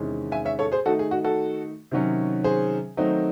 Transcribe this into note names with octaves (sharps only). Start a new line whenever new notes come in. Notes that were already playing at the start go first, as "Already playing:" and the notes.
Already playing: E2 C3 D#3 G#3 C#4
E5 G#5
C#5 E5
A4 C#5
G#4 C5
D#3 A3 D#4 F#4 A4
G#4
F#4
F#4 A4
C3 D#3 F#3 C#4
G#4 C5
D#3 F#3 A3 C4 D#4